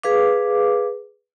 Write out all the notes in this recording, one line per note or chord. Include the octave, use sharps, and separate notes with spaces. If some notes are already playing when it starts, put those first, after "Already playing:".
G#4 B4 F5 D6